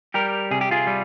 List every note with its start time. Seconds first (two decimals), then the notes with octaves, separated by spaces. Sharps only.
0.14 G3 G4 A#4
0.51 C3 G#4
0.61 G4
0.71 F4 G#4
0.87 G3